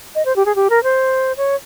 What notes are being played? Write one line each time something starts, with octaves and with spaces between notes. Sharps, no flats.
D#5
C5
G4
G#4
G4
A#4
C5
C#5